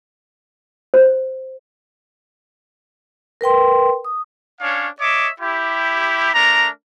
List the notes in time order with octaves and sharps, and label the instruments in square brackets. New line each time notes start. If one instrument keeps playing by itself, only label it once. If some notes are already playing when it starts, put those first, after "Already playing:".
[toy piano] C5
[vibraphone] A#4 B4 G5 C6
D#6
[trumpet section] C#4 D4 C#5 F5
C#5 D#5 E5 D6
E4 G4
A3 D4 A#4 A#5